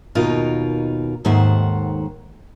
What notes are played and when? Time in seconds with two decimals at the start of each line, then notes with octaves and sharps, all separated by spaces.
0.15 D#2 B2 D#4 F4 A#4
1.25 D#2 G#2 D#3 A3 C5 F#5